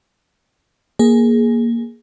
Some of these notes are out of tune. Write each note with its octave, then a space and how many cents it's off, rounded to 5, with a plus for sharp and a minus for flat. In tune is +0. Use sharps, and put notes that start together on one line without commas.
A#3 +5 G#4 +0